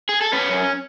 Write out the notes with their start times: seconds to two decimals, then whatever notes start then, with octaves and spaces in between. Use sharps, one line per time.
0.09 G#4
0.21 A4
0.33 C#4 B4
0.49 F#2